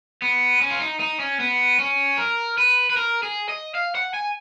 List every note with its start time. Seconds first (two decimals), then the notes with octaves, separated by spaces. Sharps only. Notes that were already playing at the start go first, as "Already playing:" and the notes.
0.22 B3
0.61 C#4
0.71 F4
0.81 D#4
1.00 D#4
1.20 C#4
1.40 B3
1.79 C#4
2.18 A#4
2.58 B4
2.90 B4
2.97 A#4
3.23 G#4
3.49 D#5
3.75 F5
3.95 F#5
4.14 G#5